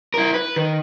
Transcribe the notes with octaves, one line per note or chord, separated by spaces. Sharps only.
E4 A#4
B4
D#3